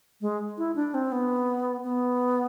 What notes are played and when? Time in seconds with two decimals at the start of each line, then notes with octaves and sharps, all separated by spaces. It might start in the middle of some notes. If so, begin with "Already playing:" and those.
0.21 G#3
0.58 E4
0.76 D4
0.94 C4
1.12 B3
1.84 B3